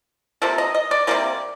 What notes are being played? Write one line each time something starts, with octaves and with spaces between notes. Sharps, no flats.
C3 F3 A#3 A4
D#5
D#5
D5
C3 G3 A#3 D5